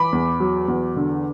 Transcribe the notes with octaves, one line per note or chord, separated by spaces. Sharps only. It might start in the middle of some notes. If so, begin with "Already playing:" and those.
Already playing: E3 B5 D6
E2
F#3
E2
D3